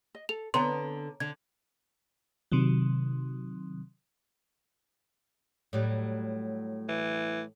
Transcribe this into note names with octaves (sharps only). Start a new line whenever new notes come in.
D#5
A4 F7
D3 B3 C#5 A#5 C6
D3 G#6
C3 D#3 F#3
A2 F#3 G3
E3